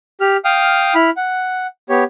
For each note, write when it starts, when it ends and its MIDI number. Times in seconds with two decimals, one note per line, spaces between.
0.20 0.37 67
0.20 0.37 89
0.45 0.94 77
0.45 0.94 79
0.45 0.94 87
0.45 0.94 89
0.95 1.10 64
0.95 1.10 83
0.95 1.10 89
1.17 1.67 78
1.89 2.04 59
1.89 2.04 67
1.89 2.04 73